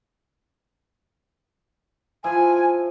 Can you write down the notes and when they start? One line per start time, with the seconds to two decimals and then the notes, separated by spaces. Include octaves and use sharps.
2.24 F3 E4 G#5